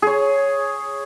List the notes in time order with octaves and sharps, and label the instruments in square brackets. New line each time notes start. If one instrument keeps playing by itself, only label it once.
[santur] G#4 C#5